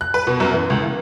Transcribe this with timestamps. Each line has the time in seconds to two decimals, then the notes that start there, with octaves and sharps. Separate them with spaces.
0.01 F#6
0.14 B4
0.27 B2
0.40 F#2
0.54 E3
0.70 C#2
0.82 E3